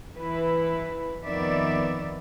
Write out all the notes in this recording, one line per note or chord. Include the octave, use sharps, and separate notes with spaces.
E3 E4 B4
F2 D#3 B3 D5 E5